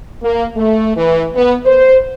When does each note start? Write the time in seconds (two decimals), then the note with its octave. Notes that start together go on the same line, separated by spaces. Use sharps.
0.23 A#3
0.57 A3
0.97 E3
1.35 B3
1.66 C5